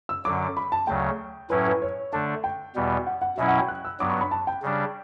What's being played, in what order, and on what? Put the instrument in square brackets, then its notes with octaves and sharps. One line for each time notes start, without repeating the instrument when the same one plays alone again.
[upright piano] E6
[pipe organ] F#2 D3 F#3 [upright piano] D6
[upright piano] B5
A5
[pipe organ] D2 C#3 F#3 [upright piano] G5
[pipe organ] A2 F#3 C#4 E4 [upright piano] B4
[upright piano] B4
C#5
[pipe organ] D3 A3 D4 [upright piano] A5
[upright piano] G5
[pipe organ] E2 B2 G3 B3
[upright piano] F#5
F#5
[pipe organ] B2 F#3 C#4 E4 [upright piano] E5
[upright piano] F#5
G5
F#6
E6
[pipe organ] G2 F#3 B3 [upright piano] D6
[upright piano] C#6
B5
A5
G5
[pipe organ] C#3 G3 D4